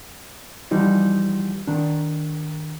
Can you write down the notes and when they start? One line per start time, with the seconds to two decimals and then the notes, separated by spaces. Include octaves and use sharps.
0.71 E3 F3 G3 D#4 F#4
1.67 D#3 D4